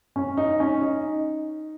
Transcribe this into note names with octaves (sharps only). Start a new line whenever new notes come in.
C#4
D#4
C#4
D#4